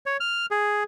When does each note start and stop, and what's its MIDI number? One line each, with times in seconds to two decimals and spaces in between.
0.06 0.17 73
0.20 0.46 89
0.51 0.84 68